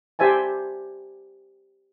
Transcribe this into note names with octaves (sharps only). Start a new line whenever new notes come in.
G4 C5 E5 G#5 A5